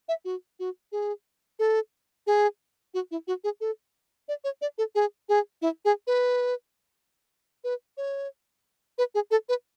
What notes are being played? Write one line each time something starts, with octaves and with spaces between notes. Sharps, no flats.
E5
F#4
F#4
G#4
A4
G#4
F#4
E4
F#4
G#4
A4
D5
C#5
D5
A4
G#4
G#4
E4
G#4
B4
B4
C#5
B4
G#4
A4
B4